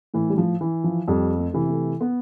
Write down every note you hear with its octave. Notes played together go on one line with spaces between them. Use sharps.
A2 E3
G3
F3
E3
F3
F2 G3
A3
C3 E3
A3
B3